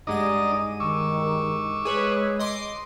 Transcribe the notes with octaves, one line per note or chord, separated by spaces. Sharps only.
G2 G#3 D#4 D5 D#5 F#5 D#7
D#3 C#6 D6 E6
G#3 G#4 B4 C#5
D#5 C6 D6